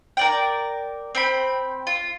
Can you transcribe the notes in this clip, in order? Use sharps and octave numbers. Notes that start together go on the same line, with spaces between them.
A#4 D5 G5
C4 G5 B5
F4